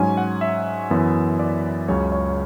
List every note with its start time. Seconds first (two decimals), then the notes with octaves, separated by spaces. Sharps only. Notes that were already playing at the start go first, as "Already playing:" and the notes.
Already playing: G#2 F#3 C#4 G#5
0.17 F#5
0.41 E5
0.90 F#2 E3 B3
1.39 D5
1.88 C#2 C#3 F#3 C#5
2.12 C#5